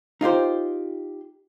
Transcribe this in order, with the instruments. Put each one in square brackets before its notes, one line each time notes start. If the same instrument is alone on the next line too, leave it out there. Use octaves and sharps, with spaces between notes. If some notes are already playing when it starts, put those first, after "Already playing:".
[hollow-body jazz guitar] D#4 F4 G4 C5